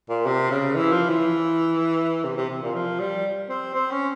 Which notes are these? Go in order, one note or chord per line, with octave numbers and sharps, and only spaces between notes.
A#2
C3
C#3
E3
F3
E3
C3
C3
C3
A#2
F3
G3
C4
C4
C#4